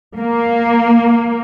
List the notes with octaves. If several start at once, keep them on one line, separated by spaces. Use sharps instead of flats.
A#3